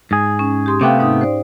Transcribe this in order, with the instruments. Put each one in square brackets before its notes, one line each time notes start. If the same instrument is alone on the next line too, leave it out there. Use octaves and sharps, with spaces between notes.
[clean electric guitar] G#2 G#4
[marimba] C#4
G4 C6 D#6
[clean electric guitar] C3 A3 B3 [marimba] F5 G5 D6
[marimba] G#2 D#4 D#6
C5 D5